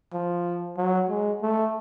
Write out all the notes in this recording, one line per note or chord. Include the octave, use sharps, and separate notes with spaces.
F3
F#3
G#3
A3